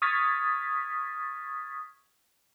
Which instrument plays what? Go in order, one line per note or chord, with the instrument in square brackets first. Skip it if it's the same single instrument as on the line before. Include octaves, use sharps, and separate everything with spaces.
[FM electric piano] C#6 D#6 F6 G#6 A6 B6